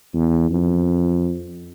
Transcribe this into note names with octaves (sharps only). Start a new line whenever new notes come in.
E2
F2